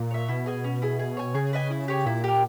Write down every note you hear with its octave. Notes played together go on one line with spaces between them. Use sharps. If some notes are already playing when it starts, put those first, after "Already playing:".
Already playing: A#2
C#5 E5
B2 E4
G#4 D#5 G#5
C#4
E4 G#4
G#4
C#5 G#5
C#3 G#4
B4 D#5 G#5
E4
G4 C#5 G#5
A#2 E4
G4 A#4